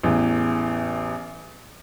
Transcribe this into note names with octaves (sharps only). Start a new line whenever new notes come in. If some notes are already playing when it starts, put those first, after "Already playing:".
A1 E2